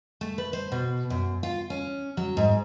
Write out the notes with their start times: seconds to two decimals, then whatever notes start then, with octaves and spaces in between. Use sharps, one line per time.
0.21 A3
0.38 B4
0.53 C5
0.72 B2
1.10 F#2
1.43 F4
1.70 C#4
2.17 F#3
2.37 G#2